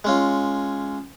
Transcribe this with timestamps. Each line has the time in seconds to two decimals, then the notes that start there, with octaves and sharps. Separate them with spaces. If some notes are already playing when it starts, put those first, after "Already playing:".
0.04 G#3 C#4 F4